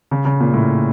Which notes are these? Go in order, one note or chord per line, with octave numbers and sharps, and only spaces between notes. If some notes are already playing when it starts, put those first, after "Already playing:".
C#3
C#3
A#2
A2